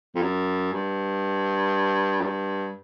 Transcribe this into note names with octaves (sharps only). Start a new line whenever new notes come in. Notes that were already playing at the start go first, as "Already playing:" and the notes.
F2
F#2
G2
F#2
G2